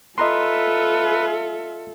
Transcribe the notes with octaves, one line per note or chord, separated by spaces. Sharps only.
F4 A4 B4 D#5 E5 A#5 C6